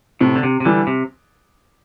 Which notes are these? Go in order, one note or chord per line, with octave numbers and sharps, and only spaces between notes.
A2 C3
D3
C3
C3
D3 E3 G3
C3